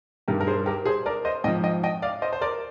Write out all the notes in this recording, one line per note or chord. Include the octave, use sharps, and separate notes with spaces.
G2 D#3 G4 A#4
A#4
G#4 C5
G4 A#4
G#4 C5
A#4 D5
C5 D#5
G#2 F3 D#5 G5
D#5 G5
D#5 G5
D5 F5
C5 D#5
C5
A#4 D5